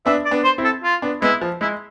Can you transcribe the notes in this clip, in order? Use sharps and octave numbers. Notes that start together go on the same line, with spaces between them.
B3 D4 E5
D5
B3 D4
C5
C4 E4
A4
F4
B3 D4
G#3 B3 E4
F3
G#3 E4